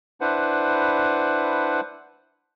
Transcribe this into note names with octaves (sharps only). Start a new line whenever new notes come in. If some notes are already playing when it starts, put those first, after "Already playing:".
D4 E4 B4 C5 F#5